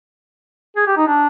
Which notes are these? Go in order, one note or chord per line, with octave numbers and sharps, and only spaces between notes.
G#4
G4
D#4
D4